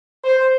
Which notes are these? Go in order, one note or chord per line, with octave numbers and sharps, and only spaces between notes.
C5